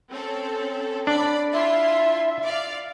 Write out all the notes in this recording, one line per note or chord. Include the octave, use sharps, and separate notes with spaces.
C4 C#4 A4
D4 D5 B5
E4 F4 E5 C6
D5 F5